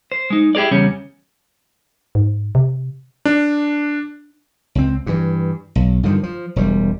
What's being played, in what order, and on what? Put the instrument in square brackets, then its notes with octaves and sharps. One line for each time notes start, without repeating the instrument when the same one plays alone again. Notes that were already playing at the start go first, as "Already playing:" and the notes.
[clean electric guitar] C5
G#3 D#4
E4 G4 G#4 A#4 D5
E2 C#3 G3 C#4
[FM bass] G#2
C3
[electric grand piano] D4
[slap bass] C#2 C4
G2 E3
B1
G2 D3 D#3 F3
F3
E1 D2 G3